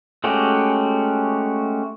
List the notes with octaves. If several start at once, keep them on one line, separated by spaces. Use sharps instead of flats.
G#3 A3 C#4 F#4 G4